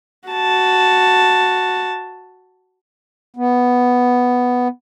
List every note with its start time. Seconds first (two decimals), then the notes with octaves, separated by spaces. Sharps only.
0.29 F#4 A5
3.36 B3